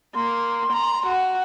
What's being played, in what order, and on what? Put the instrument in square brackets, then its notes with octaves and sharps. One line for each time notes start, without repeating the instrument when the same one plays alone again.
[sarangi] A#3 [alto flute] C6
[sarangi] A#5
F#4